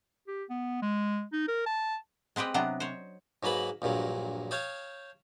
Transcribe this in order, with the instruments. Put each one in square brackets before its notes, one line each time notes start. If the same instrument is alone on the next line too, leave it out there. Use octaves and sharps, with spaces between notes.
[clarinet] G4
B3
G#3
D#4
A#4
A5
[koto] G#3 C4 G4 B4 D#5
C3 F#3 B3 D4 D#5
C5 C#5
[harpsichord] G#2 F#3 A#3 B4 A5 B5
A#1 G2 A#2 F#3
C#5 F5 G5 A5 D#6